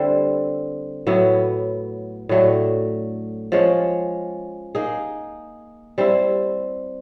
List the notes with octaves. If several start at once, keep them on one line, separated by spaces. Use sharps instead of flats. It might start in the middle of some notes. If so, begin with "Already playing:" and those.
Already playing: D3 G3 C4 E4
A2 F#3 B3 E4
A2 F#3 A3 D4
F3 G#3 C#4
A#3 D#4 G#4
G3 C4 E4